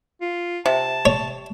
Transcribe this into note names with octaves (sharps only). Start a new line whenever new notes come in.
F4
C3 A5
C#5